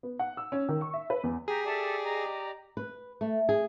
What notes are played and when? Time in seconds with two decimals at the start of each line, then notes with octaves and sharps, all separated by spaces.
0.03 B3
0.19 F#5
0.37 E6
0.52 C#4
0.69 D#3
0.81 C#6
0.94 E5
1.10 B4
1.24 E2
1.48 G4 G#4 A#5
1.65 G4 A4 D5 E5 A5
2.02 D#5 A#5
2.77 B4
3.21 A3
3.49 G#4